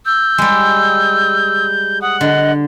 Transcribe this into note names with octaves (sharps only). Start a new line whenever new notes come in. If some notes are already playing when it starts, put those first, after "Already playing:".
E6 G6
G3 G#3
F#5 D#6
D3 D#5